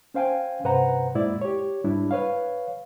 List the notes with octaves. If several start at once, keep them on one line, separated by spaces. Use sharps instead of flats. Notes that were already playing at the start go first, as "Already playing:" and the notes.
C#4 C5 F5 G5 G#5
G2 C3 B4 C5 F#5 A#5
F#2 A#2 G#3 E4 D5
G4 C#5
G#2 G3 D4 E4
B4 C#5 F5